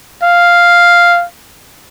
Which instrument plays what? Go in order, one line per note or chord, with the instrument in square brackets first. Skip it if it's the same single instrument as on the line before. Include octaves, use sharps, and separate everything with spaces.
[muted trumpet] F5